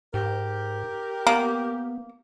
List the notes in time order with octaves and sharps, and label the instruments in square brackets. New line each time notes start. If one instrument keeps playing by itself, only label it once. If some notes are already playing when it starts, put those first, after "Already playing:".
[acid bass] G#2 [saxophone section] G4 A#4
[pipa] A#3 [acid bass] B3